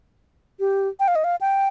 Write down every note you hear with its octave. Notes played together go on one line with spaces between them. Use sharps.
G4
G5
F5
D#5
F5
G5